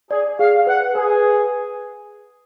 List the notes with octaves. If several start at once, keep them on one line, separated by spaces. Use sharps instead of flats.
G#4 D5
G#4 F5
B4 F#5
G#4 B4